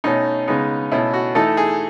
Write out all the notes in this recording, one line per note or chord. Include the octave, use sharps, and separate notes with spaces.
B2 A3 C#4 D#4
C#3 G#3 B3 D#4
B2 A3 C#4 E4
F#4
E3 A3 D#4 A4
G#4